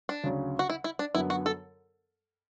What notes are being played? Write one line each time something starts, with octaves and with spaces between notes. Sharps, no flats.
D4
D2 C#3 F#3 C#4
F#4
E4
E4
D4
F#2 D3 F#3 B3 E4
F#4
A4